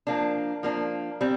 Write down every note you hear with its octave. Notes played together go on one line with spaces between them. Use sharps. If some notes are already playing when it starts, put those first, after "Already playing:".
F3 A#3 D4
F3 A#3 D4
G3 C4